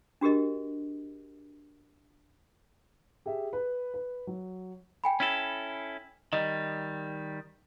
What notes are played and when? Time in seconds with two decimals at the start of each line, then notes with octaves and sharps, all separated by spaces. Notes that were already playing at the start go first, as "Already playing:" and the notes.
0.21 D4 F#4 G4 A#4 D#5
3.26 G4 G#4 E5
3.53 B4
3.94 B4
4.27 F#3
5.04 G5 G#5 B5
5.20 C#4 E4 A4
6.33 D#3 G3 D#5